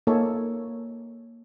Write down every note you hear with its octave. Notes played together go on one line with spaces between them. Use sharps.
A#3 D#4 A4 C#5 G#5